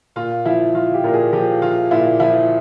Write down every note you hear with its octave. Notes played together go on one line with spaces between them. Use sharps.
A#2 F4
F3 E4
F3 F4
G4
A#2 A#4
G#4
F3 G4
F3 F4
A#2 E4
F3 E4